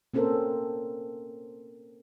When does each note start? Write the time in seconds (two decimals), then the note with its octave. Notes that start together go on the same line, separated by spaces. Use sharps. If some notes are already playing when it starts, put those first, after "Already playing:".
0.14 A#3 C4 C#4 A4 A#4 C5